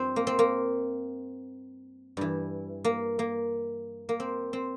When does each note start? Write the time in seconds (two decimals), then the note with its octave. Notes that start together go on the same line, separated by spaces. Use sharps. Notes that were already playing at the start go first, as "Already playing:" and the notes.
Already playing: G2 F3 C4
0.16 A#3
0.27 C4
0.39 A#3
2.17 G2 E3
2.85 A#3
3.19 A#3
4.09 A#3
4.20 C4
4.53 C4